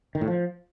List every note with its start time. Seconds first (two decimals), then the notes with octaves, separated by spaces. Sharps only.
0.15 D#3
0.21 A2
0.27 F3